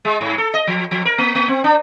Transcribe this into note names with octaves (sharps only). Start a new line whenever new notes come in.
G#3
G#2
A4
D#5
F3
F3
A#4
A#3
A#3
C4
D4